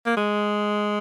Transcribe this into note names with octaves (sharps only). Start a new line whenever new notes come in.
A#3
G#3